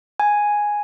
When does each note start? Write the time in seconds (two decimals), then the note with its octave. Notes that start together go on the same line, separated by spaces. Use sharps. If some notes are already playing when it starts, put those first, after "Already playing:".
0.20 G#5